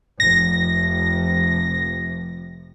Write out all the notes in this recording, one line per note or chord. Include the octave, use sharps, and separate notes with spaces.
F1 C3 F3 A#6